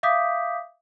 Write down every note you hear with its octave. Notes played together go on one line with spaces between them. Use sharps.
E5 F5 D6 D#6 G6 B6